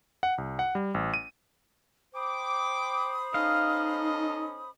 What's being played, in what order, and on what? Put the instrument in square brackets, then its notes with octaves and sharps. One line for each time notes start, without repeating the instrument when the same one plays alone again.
[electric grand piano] F#5
C2
F#5
G3
A1
D#7
[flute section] C5 B5 D#6 [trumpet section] G5 D6
[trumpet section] C#4 A4 D#5 [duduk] D#4 [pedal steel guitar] F5